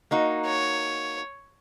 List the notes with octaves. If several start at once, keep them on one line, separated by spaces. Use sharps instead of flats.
A#3 D#4 F#4
C#5